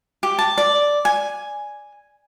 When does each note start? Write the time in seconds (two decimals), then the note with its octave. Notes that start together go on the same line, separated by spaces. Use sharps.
0.23 G4
0.39 A5
0.58 D5
1.05 G#5